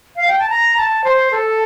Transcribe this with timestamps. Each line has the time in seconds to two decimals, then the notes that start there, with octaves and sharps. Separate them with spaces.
0.16 F5
0.27 G5
0.39 A5
0.50 A#5
0.77 A5
1.04 C5
1.31 A4